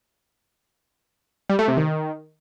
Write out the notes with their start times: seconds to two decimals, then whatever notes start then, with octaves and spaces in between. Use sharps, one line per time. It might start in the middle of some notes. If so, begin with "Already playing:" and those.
1.49 G3
1.59 A3
1.68 C3
1.77 D#3